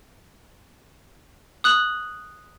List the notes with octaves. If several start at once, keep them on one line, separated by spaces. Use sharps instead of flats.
D#6 F#6 F#7